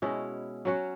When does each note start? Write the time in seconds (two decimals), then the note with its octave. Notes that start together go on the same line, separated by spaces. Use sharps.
0.02 B2 G#3 C#4 E4
0.65 F#3 C#4 F#4